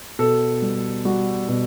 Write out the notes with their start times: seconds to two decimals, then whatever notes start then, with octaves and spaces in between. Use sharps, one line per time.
0.19 B2 A4
0.62 G3
1.05 G3 F#4
1.48 B2